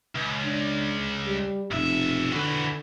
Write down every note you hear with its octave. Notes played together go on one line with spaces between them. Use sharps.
C#2
D4
G3
F1 B1 E5
D3 E3 F#4